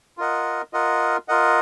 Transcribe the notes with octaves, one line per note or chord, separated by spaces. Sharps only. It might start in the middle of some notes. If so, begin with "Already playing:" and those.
F4 A#4 D#5 F#5
F4 A#4 D#5 F#5
F4 A#4 D#5 F#5